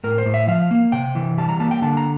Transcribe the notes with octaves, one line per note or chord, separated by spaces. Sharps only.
A2 A#4
C5
A2
E5
F3 F5
A#3
C3 G5
E3
G3 A5
A#5
A#3 A5
G5
D3 A5
A#5